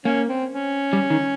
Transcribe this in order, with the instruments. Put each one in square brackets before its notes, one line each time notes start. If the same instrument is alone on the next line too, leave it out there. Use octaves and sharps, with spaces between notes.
[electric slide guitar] A#3 [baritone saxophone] C#4
[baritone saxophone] C4
C#4
[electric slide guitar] G3
D#3